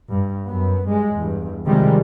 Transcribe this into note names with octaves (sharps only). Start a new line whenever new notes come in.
G2
F#2 B3
G2 G#3
E2 G2
C3 D#3 F3 G3 G#3